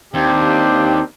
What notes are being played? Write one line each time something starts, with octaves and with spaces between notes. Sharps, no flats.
D#2 C4 D4 G4